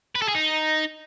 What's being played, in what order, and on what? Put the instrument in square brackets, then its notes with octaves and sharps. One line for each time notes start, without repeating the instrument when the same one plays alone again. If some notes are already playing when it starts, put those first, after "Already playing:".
[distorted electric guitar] B4
A4
G#4
D#4